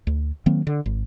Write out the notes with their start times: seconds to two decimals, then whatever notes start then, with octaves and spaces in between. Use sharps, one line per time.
0.07 D2
0.46 D#3 F#3 A#3 C4
0.67 D3
0.86 G#1